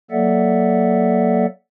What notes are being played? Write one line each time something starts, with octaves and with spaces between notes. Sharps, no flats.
F#3 A#3 A4 D5 E5 F#5